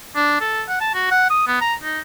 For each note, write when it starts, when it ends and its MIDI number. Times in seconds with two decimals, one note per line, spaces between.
0.16 0.38 62
0.41 0.63 69
0.68 0.76 78
0.80 0.92 81
0.94 1.06 66
1.11 1.28 78
1.30 1.43 87
1.47 1.61 59
1.61 1.74 82
1.83 2.00 63